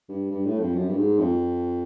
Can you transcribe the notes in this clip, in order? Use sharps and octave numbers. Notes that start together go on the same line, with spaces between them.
G2
G2
A2
F2
F#2
G2
G#2
F2